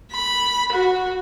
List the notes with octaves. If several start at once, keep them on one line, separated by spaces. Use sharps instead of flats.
B5
F#4